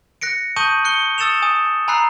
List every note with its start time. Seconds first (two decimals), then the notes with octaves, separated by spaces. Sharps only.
0.21 F#6 A#6 C#7 D7
0.56 A5 C#6 D#6 G6 D#7 F#7
0.85 F#6 C#7 G7
1.18 D#6 E6 A6 C#7 E7 F7
1.42 G#5 D#6
1.88 G#5 A#5 B5 E6 F#6 C7